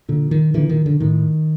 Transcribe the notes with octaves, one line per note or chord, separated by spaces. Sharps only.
A#2 D3
D#3
A#2 D3 E3
D#3
D3
A2 D#3